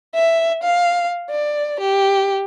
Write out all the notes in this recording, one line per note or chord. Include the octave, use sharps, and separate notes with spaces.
E5
F5
D5
G4